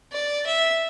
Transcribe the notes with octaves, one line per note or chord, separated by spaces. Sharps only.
D5
E5